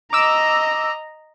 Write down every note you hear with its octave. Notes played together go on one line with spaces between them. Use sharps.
D#5 A#5 D6 E6